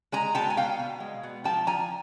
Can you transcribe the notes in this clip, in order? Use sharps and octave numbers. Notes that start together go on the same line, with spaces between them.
G#3 G#5 A#5
B2 G5 A5
G#5
B2 F5 G5
B2
G#3
B2
F3 G5 A5
F3 G#5 A#5